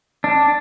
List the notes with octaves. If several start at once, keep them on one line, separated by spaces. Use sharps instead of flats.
D4